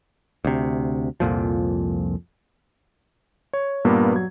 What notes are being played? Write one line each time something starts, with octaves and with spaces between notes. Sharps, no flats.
D2 C3
C2 F2 A#2 F3
C#5
G2 A#2 A#3 B3 G4
F#3 G#6